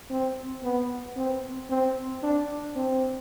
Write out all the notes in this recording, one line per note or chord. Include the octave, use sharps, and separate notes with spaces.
C4
B3
C4
C4
D4
C4